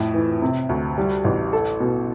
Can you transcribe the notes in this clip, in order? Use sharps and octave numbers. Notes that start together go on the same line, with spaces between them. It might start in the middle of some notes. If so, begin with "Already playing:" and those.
Already playing: F2 A2
E3
C3
D2
G3
A1
A4
B2